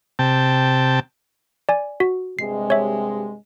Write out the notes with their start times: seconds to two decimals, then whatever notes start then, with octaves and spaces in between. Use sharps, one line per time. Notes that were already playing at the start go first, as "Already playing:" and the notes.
0.19 C3 G5 A5
1.69 D5 G#5
2.00 F#4
2.39 G2 C3 G#3 C7
2.70 C#5 E5